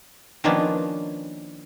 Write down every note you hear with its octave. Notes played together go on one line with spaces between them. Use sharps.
D#3 F3 A#3 B3 C#4 D4